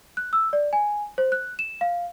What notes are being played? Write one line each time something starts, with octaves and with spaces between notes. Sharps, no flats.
F#6
E6
D5
G#5
C5
F#6
E7
F5